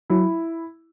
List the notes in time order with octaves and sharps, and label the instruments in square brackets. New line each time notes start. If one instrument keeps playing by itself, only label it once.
[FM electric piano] F#3 [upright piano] E4